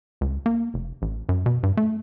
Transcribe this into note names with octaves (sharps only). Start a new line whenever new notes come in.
C#2
A#3
F1
A1
F#2
B2
G2
A3